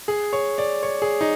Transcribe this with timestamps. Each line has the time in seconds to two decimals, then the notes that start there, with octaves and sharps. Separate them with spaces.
0.08 G#4
0.33 C#5
0.58 D5
0.83 C#5
1.02 G#4
1.21 D#4